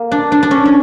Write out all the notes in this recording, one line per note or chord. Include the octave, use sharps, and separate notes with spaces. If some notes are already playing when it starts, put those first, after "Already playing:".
Already playing: A#3
D4
D4
D4
C#4
C#4